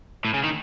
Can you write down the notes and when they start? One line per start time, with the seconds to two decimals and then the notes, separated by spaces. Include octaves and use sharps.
0.25 A2
0.34 C#3
0.44 D#3